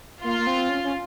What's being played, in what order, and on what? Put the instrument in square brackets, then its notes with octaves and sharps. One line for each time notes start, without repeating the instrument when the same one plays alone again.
[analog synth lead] A#3 [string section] F4
[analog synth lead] A#3
C4
C#4
C#4